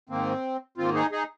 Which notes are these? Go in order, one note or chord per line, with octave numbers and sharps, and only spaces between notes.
G#2 D#3 A#3 C4
G#2 D#3 A#3 C4 F4
D#4 G#4
D#4 G#4